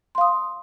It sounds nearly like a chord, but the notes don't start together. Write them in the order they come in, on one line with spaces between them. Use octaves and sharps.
C6 F5 D#6